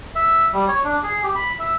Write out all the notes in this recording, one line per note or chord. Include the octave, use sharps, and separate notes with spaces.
E5
G3
C#5
D4
G#4
G4
B5
E5